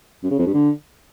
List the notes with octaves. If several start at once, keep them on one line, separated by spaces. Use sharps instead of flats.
F#2
C#3
F2
G2
D3